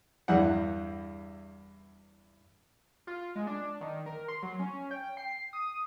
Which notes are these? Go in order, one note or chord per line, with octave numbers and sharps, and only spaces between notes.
E2 G2 E4 F#5
F4
G#3
D4
D#3
A#4
C6
F#3
C#4
G5
C7
D#6